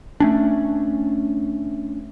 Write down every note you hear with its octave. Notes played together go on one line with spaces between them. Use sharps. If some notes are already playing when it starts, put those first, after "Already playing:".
A3 C#4 D4